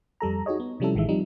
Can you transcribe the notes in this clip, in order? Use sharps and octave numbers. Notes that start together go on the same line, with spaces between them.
F2 G3 A4 A#5
D#4 F#4 G#4 C#5 D#5
B3
C3 F3 G3 C#4 E4 A4
A1 D#3 E3 G#3 E5
F3 G3 C4 D#4